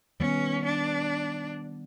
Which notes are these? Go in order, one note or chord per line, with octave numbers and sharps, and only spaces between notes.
D#3 G3 B3 C#4
D4